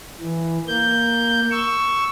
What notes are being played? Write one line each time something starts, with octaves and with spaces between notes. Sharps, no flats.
E3
A#3 G6
C#6 E6